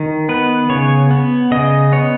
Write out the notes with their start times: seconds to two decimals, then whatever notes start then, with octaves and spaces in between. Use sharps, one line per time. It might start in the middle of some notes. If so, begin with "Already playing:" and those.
Already playing: D#3
0.29 B3 B4
0.69 C#3 C#5
1.11 B3
1.51 C#3 D#5
1.92 B3 C#5